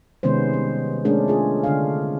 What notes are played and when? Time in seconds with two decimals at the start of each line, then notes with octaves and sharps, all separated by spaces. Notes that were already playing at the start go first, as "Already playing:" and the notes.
0.23 C3 D#3 G#3 B3 C#4 C5
0.54 G3
1.05 G#3 A3 C#4 D4 G#4 A#4
1.28 F4 G#4
1.64 D3 D4 F5